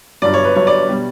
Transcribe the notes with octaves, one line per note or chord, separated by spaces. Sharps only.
G1 G2 F#3 D5
C#5
B4
G1 G2 F#3 C#5
D5
B2 G3